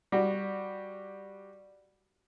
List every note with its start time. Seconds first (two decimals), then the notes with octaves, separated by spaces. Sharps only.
0.12 G3 F#4